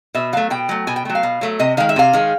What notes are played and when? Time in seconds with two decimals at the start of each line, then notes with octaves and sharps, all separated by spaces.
0.15 B2 E5
0.33 F#3 A3 F5
0.50 B2 G5
0.69 F#3 A3
0.87 B2 G#5
0.96 G5
1.05 F#3 A3
1.15 F5
1.23 B2
1.41 F#3 A3
1.59 C3 D#5
1.77 D#3 G#3 F5
1.89 E5
1.96 C3 F5
2.13 D#3 G#3